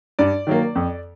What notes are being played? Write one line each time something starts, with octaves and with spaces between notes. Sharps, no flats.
G2 D5
D#3 F#3 A#3
F2